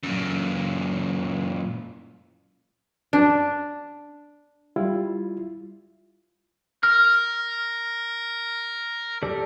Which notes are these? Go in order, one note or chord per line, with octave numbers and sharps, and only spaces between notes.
F#2 A#2
D4
G3 E4 F4
A#4 F6
G4 A4 D5